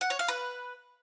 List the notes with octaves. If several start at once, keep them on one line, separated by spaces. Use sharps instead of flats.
F#5
C#5
F5
B4